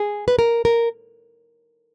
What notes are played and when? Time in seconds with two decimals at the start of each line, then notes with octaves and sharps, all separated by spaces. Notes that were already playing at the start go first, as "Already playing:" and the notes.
Already playing: G#4
0.28 B4
0.39 A#4
0.65 A#4